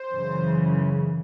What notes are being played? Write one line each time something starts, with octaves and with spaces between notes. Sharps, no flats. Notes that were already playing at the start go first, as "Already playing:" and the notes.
Already playing: C5
F#2 C#3 E3